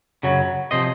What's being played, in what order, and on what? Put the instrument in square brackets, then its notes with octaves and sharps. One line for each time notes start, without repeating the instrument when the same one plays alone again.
[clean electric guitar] F#2 C#3 F#3
C3 F3 C5 D#5